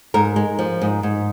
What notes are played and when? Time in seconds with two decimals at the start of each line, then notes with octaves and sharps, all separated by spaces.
0.14 G#2 A#4
0.36 G#3
0.59 F3
0.81 G#2
1.03 G#2